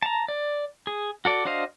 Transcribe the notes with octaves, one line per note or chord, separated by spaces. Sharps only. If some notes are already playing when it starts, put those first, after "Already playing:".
A5 A#5
D5
G#4
F#4 A4 D5
D4 F#4 C5 D#5 F5